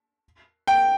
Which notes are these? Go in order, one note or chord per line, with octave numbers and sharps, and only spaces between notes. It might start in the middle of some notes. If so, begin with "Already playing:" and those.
G5